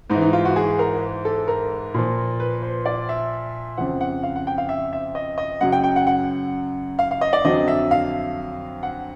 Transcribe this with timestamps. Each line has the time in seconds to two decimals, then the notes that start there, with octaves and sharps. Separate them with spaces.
0.10 G#2 D#4
0.15 E3
0.21 D#4
0.33 F4
0.45 F#4
0.56 G#4
0.79 A#4
1.25 A4
1.48 A#4
1.94 A#2 F3
2.40 B4
2.62 C5
2.86 D5
3.09 E5
3.77 F2 C#3 F3 F#5
4.01 F#5
4.23 F5
4.36 F#5
4.47 G5
4.58 F5
4.69 E5
4.93 E5
5.15 D#5
5.38 D#5
5.61 F#2 C#3 F#3 F#5
5.72 G5
5.84 G5
5.96 F#5
6.07 F#5
6.99 F5
7.11 F5
7.21 D#5
7.33 D5
7.44 F2 D3 F#3 D#5
7.68 E5
7.91 F5
8.83 F#5